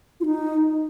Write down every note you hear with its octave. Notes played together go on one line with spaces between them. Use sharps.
F4
D#4